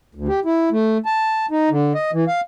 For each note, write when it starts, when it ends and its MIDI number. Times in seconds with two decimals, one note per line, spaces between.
0.15 0.28 38
0.28 0.40 67
0.45 0.69 64
0.72 0.98 57
1.06 1.46 81
1.51 1.69 63
1.70 1.93 50
1.95 2.11 75
2.13 2.24 52
2.28 2.41 77